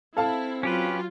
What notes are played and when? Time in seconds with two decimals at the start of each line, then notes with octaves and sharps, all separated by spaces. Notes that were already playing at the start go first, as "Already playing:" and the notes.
0.17 C4 E4 A4 F5 A5
0.63 F#3 C#4 F4 G4 B4